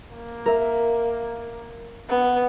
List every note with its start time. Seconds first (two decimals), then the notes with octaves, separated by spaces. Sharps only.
0.14 A#3
0.46 A#4 E5
2.09 B3